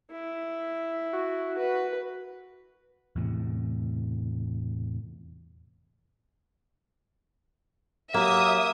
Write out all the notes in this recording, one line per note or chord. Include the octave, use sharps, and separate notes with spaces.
E4
F#4
B4
E2 A2 C3
F#3 A#3 G4 E5 D#6